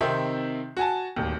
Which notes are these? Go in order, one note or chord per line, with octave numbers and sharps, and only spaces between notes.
C3 D#3 C4 D#4 E5
F#4 G#5 A5
D1 D#2